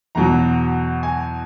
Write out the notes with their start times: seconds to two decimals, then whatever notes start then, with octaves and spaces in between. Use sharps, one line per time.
0.15 E2 B2 F#3 A#5
1.03 G#5